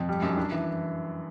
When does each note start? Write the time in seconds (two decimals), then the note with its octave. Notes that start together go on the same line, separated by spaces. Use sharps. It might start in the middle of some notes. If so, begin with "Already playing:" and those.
Already playing: F2
0.09 G3
0.22 F#2
0.37 D4
0.52 E3